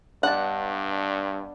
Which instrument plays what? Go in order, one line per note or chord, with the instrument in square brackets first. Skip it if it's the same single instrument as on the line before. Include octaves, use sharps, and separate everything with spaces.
[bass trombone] G2 [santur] B3 D4 D#5 [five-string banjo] F#5 A5